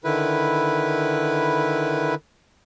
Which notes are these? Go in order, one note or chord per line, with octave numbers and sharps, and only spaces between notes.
D3 D#3 E4 B4